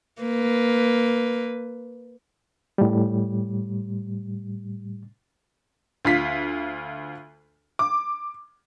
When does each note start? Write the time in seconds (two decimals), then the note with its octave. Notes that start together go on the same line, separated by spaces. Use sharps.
0.22 A#3 B4
2.78 A2 G3
6.05 D2 F4 B6
7.79 D6